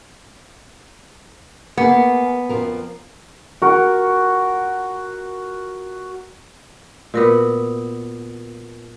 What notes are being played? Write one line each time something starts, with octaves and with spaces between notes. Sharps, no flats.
A#3 B3 G#4 A#4
F2 F3 A#4
F#4 A#4
A#2 B3 F#4 A#4 B4